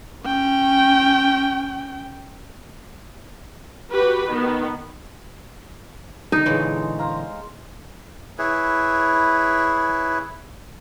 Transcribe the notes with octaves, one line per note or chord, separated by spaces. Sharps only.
C#4 G5
F#4 G4 B4
D#3 B3
D3 D#3 D#4
A#2 D3 E3 G#3 C#5
C5 F5 A#5
E4 G#4 B4 C#5